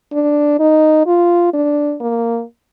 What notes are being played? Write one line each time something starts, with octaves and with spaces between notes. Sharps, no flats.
D4
D#4
F4
D4
A#3